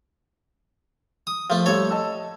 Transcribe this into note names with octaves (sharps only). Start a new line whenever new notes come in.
D#6
F3 A3
G3 A3 A4 C#5
D#5 A5 E6